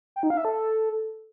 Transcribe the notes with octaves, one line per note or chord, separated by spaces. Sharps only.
G5
D#4
F5
E5
A4